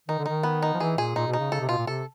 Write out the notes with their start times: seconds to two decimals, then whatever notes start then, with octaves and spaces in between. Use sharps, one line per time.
0.08 D#3 D#4
0.19 D3
0.26 D#3 D#4
0.43 B3
0.62 D#4
0.74 F3
0.80 E3 G#4
0.98 A#2 G#4
1.15 A#2 D#4
1.27 B2
1.33 D#4
1.39 C#3
1.52 C#3 A4
1.60 C3
1.69 B2 F4
1.78 A#2
1.87 C3 A4